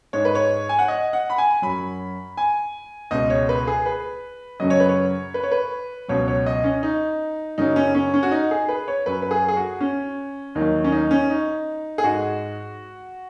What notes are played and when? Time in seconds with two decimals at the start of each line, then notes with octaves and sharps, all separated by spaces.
0.13 G#2 G#3 C#5
0.25 B4
0.35 C#5
0.69 G#5
0.79 F#5
0.88 D#5
1.13 F#5
1.30 B5
1.38 G#5
1.62 F#2 F#3 B5
2.37 G#5
3.11 C#2 B2 G#3 D#5
3.30 C#5
3.49 B4
3.67 G#4
3.86 B4
4.60 F#2 C#3 F#3 D#5
4.70 C#5
4.80 B4
4.89 C#5
5.34 B4
5.44 C#5
5.51 B4
6.08 C#2 B2 F#3 C#5
6.28 C#5
6.46 D#5
6.64 C#4
6.83 D#4
7.58 F#2 C#3 F#3 D#4
7.76 C#4
7.95 C#4
8.14 C#4
8.23 F#4
8.31 D#4
8.51 G#4
8.69 B4
8.88 C#5
9.06 F#2 F#3 B4
9.22 B4
9.31 G#4
9.48 G#4
9.56 F#4
9.81 C#4
10.55 D#2 D#3 F#3 D#4
10.84 C#4
10.92 D#4
11.11 C#4
11.30 D#4
11.98 G#4
12.04 G#2 G#3 F#4